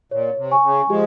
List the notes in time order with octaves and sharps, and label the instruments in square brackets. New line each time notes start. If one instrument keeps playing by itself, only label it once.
[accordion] A#2 [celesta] C#5
[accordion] C3
[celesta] G#5 C#6
[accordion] C#3
[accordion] F3 G#3 [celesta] G4